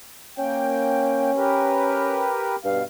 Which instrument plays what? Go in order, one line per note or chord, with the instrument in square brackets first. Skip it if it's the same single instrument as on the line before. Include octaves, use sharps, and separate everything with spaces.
[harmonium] A#3 G5 [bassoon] C#4
[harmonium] G4 A#4 B4
[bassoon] G2 [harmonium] B2 F5